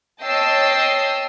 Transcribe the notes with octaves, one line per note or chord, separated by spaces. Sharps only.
C#5 D#5 G5 A5 E6 C7